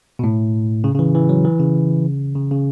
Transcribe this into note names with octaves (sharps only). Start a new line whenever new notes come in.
B2
A2
C#3
C#3
E3
E3
F#3
E3
C#3
C#3
C#3